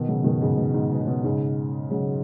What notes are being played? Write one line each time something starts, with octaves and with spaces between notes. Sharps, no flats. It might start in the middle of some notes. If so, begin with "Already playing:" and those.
Already playing: B2 D#3
C#3 F#3
B2 D#3
G#2 C#3
B2
G#2
B2
C#3
B2
G#2 C#3
C#3 F#3